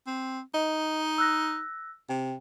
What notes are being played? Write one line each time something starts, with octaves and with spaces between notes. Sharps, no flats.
C4
D#4 D#5
E6 F#6 A#6
C3 G5